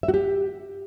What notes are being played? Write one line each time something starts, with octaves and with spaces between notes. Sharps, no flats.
E5
F#4
G4